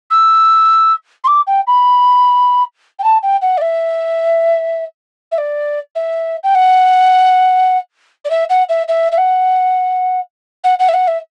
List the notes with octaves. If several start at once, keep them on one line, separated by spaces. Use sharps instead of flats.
E6
C6
D6
G5
B5
G5
A5
G5
F#5
D5
E5
E5
D5
E5
G5
F#5
D5
E5
F#5
E5
E5
E5
F#5
F#5
F#5
E5
F#5
E5